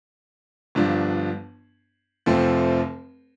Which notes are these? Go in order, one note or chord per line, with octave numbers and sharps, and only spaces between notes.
G1 G2 F3 D4
F1 F2 F3 A3 C4